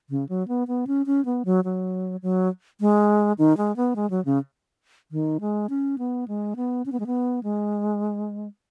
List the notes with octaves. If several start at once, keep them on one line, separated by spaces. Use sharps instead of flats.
C#3
F#3
B3
B3
C#4
C#4
B3
F#3
F#3
F#3
G#3
D#3
G#3
B3
G#3
F#3
C#3
D#3
G#3
C#4
B3
G#3
B3
C#4
B3
G#3
B3
G#3